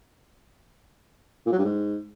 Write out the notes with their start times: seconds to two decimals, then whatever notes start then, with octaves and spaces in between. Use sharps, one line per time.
1.46 A#2
1.52 F#3
1.58 G2
1.65 G#2